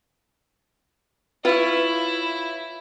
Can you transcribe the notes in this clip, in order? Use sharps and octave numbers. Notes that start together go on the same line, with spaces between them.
E4 F4 B4 C#5